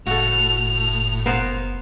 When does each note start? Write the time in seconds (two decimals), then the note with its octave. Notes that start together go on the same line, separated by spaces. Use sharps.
0.06 F#1 A2 F#4 A4 F7
1.26 B3 A#4 C5